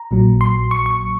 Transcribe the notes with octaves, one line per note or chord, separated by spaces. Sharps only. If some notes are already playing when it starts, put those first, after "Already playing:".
Already playing: A#5
A#1 A#2 F#3
C6
C#6
C#6